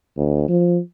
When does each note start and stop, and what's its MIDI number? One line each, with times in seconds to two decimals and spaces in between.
0.18 0.48 38
0.49 0.79 53